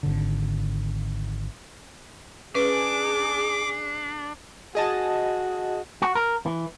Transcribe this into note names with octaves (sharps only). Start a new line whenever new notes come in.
G#1 D3
C#4 D4 G#4 B4 D6
F#4 G#4 D#5 A5
F#4
A#4
E3